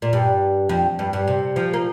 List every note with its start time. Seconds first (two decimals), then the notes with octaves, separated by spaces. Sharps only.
0.02 A#2
0.13 G2
0.69 F2
0.99 G2
1.13 G2
1.28 C3
1.56 F3
1.74 A#3